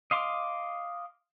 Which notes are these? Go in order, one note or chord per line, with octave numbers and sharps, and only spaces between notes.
D#5 F5 C6 D6